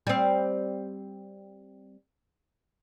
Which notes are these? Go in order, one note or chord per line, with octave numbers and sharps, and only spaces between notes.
G3 C4